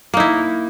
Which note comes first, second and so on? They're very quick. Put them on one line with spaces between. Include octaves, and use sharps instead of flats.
A#3 D#4 E4